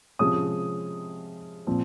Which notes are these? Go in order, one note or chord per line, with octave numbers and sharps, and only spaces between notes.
C3 F3 G#3 C#4 D#6
A#2 F3 C4